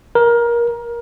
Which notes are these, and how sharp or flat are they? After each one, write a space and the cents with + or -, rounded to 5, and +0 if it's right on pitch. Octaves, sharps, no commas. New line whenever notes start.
A#4 +20